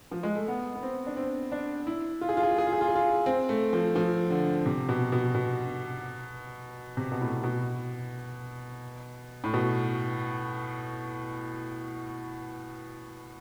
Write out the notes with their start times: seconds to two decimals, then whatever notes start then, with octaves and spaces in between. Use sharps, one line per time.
0.11 F3
0.23 G#3
0.35 A3
0.48 B3
0.75 B3
0.83 C4
1.06 D4
1.16 C4
1.52 D4
1.87 E4
2.21 F4
2.29 G#4
2.37 F4
2.43 G#4
2.51 F4
2.58 G#4
2.67 F4
2.73 G#4
2.81 F4
2.88 G#4
2.95 F4
3.26 C4
3.49 A3
3.73 F3
3.95 F3
4.30 D3
4.66 C3
4.89 B2
5.12 B2
5.34 B2
6.97 C3
7.12 B2
7.21 A2
7.43 B2
9.44 A2
9.54 B2